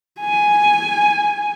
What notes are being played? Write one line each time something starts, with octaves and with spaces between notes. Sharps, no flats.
G#5